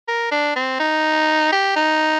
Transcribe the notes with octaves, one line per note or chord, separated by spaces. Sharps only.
A#4
D4
C4
D#4
G4
D#4